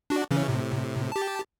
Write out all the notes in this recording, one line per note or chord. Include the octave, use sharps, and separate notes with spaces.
D4 F#4
C#3 E3 C#4
A2 C3
G4 A5